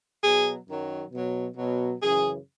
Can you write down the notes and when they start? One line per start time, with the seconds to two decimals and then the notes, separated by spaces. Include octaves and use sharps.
0.21 B2 F#3 G#4
0.66 F#2 D#3 F#3
1.11 B2 F#3
1.56 B2 F#3
2.01 F#2 C#3 E3 G#4